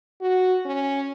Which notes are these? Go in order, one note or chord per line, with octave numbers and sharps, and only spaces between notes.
F#4
C#4